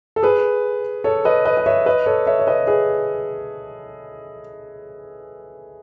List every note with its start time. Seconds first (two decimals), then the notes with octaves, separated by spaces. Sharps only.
0.16 A4
0.23 G#4 B4
1.04 A4 C#5
1.25 B4 D#5
1.45 B4 D#5
1.57 D#5
1.66 C#5 E5
1.86 B4 D#5
2.06 A4 C#5
2.27 C#5 E5
2.40 C#5
2.47 B4 D#5
2.67 G#4 B4